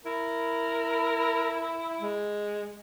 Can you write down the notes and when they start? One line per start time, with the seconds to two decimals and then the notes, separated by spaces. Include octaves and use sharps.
0.05 E4 A#4
2.00 G#3